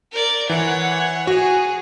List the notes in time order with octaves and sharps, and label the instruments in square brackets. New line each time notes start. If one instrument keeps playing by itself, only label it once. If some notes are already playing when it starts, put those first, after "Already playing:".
[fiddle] A#4 D5
[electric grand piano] E3 [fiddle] C#5 F#5
[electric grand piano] F#4 [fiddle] G#4